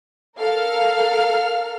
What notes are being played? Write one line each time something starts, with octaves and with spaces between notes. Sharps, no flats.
A4 A#4 F5 F6